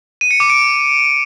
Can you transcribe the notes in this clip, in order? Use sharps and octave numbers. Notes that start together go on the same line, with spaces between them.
D#7
C#7
D6
D7